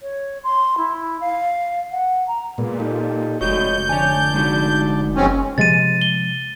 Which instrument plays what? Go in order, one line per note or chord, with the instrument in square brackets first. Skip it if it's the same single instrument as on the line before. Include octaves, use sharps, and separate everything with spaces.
[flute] C#5
C6
E4
F5
F#5
A#5
[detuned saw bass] A#2 [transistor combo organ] G#3 B3
[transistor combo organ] D#4 G4 A4
[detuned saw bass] F1 [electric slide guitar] G#3 A3 F#4 [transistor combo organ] C#5 D#5 [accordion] G6
[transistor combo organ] D3 D5 A5 [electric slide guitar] C#5 G#5
[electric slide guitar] G#3 D#4 F#4
[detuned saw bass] F#1 [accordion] G#2 C4 C#4 [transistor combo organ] F3 A#3
[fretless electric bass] C3 F3 G#3 [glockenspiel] A6 D#7
[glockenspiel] G7